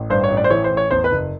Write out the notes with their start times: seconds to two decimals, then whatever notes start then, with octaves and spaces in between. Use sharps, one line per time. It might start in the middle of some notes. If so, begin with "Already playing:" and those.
Already playing: A1
0.10 G2 C5
0.24 C#5
0.30 A1
0.37 D5
0.44 C5
0.50 E3 C#5
0.64 C5
0.71 A1
0.77 C#5
0.91 E2 C5
1.04 B4
1.11 F#1